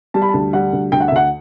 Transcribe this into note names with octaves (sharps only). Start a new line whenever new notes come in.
G3 A5
B5
D2 A5
G3 F#5
D2
D2 G5
F#5
E5
D2 F#5